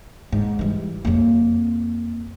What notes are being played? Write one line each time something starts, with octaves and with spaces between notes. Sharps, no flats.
G#2
E3 G3
F2 A#3